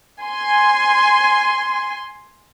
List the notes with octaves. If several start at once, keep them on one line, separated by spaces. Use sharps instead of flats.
G#5 C6